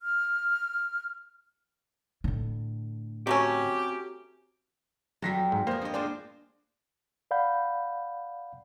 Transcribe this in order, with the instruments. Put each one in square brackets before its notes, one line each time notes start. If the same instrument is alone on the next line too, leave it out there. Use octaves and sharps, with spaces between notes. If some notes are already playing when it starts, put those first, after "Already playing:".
[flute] F6
[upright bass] A2 D3
[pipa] F#3 A3 C#4 [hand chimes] C4 F#4 [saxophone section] G4
[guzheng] F2 G3 [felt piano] F#3 A#6 B6
[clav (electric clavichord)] G#2
[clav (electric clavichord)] A#3 [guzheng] B3 G#4 [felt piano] C5
[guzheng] G2 D#5
[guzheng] G#3 F4 C5 [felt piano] D4
[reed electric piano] D5 F5 F#5 B5 G6